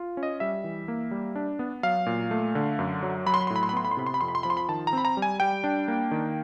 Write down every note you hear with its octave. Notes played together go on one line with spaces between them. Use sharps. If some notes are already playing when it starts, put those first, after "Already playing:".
Already playing: F4
C#4
D#5
G3 E5
E3
A#3
G3
D4
B3
F#3 F5
A#2
A3
D3
F#2
F#3
F#3 B5
C6
B5
C6
A2
B5
C6
B5
B3 C6
B5
C6
C3 B5
C6
B5
F2 C6
B5
C6
F3 B5
C6
B5
D#3 A5
A#5
C4 B5
A#5
G3
G#5
G3 G5
D4
A#3
D#3